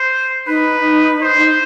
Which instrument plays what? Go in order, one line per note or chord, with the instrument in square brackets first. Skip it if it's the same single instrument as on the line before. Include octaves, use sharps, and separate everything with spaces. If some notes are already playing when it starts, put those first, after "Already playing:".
Already playing: [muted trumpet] C5
[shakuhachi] D#4 [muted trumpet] B4
[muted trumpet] C5